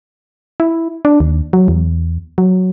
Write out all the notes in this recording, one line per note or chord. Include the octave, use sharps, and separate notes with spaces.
E4
D4
D#2
F#3
E2
F#3